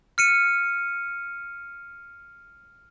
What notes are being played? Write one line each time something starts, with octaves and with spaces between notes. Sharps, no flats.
F6 C#7 D#7